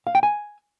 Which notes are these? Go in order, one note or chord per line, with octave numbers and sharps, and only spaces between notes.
F5
G5
G#5